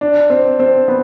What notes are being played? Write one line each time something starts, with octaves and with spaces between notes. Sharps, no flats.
D4
C4
C4
B3